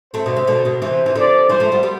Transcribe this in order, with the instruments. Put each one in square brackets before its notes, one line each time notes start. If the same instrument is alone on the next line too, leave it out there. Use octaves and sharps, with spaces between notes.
[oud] A3 C4 [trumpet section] C5
[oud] B2 D3
C3
B2 D3
B2 D3
[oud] C3 E3 [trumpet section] C5
[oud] E3
[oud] D3 F3 [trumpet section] D5
[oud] E3 G3 [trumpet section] C5
[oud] F3 A3
G3 B3
G3 B3